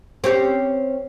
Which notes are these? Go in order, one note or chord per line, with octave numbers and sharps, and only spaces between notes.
C4 C#4 G4